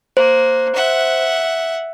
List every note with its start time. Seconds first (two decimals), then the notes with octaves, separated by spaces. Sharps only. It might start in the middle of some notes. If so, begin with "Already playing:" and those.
0.17 A#3 C5
0.75 E5 F#5